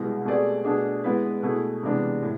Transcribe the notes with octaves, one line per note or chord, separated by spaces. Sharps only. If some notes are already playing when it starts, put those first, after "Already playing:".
Already playing: C2 B2 G#3 B3 E4
B2 A3 C4 G#4 D5
B2 A3 D4 G#4
G#3 B3 E4 B4
B2 A3 E4 G#4
C3 E3 G#3 B3 D4
A2